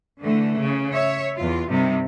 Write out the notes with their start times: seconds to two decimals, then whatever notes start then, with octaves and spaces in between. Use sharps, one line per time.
0.20 D3 E3 A3
0.58 C#3
0.93 C#5 E5
1.36 E2 F4
1.69 G2 C3 D#3 G3